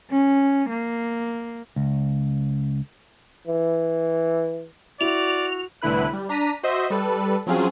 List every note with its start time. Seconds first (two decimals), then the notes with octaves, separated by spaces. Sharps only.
0.10 C#4
0.70 A#3
1.76 C#2
3.48 E3
5.01 E4 F#4 D5 F7
5.82 C2 A2 D3 E4 B4 F#6
6.13 G3
6.29 D4 A#5 B6 D#7
6.63 F#4 C5 D#5 E5
6.90 G3 A4 B4
7.46 F3 F#3 C4 C#4 F4 G#4